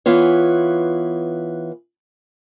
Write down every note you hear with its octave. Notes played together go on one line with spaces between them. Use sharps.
E3 B3 F4 C#5